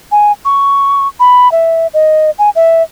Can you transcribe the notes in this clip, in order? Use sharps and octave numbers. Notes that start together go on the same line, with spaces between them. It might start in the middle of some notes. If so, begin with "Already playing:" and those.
G#5
C#6
B5
E5
D#5
G#5
E5